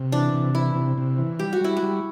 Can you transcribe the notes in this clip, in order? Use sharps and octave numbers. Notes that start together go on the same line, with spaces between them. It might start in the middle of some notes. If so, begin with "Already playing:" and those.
Already playing: C3
E3 D4
C3
E3 E4
C3
C3
E3
G3 G4
F#4
G3 E4
F#4
G3